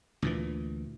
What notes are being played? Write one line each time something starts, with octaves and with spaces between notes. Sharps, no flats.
D2 A#2 E3